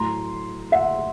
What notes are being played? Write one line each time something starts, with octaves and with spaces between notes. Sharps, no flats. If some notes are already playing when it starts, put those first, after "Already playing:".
Already playing: A2 F#3 A#5 C6
E5 F#5